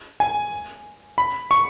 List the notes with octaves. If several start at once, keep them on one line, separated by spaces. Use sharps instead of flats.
G#5
B5
C#6